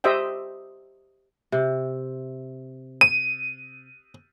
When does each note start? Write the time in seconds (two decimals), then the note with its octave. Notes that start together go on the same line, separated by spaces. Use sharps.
0.04 G4 C5 D#5 E5 G5
1.52 C3
3.01 D#7